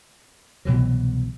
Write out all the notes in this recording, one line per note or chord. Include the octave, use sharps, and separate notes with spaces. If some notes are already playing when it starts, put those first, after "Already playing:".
C2 B2 E3 F#3